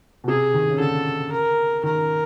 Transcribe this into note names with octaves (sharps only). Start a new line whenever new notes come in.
B2
C3 G#4
D#3
C#3
D3 A4
A#4
D#3 A#4